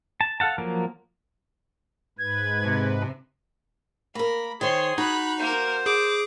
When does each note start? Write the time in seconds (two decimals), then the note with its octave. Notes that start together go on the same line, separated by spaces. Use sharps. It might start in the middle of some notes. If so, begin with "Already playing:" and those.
0.21 A5
0.40 A4 F5 F#5 A5
0.58 F3 F#3 A#3 A#4
2.19 G#2 B4 G#6
2.64 C3
4.15 A#3 A#4 B5
4.61 D#3 G#4 C5 C#5 C6
4.98 D#4 F#4 B5 F#6
5.40 A#3 A#4 C5
5.86 G#4 D6